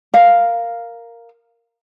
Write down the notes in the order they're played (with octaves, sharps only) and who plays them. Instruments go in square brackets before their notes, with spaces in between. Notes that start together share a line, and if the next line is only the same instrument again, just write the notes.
[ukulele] A#4 F5